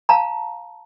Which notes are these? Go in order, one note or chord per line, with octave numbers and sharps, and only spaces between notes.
F5 A5 A#5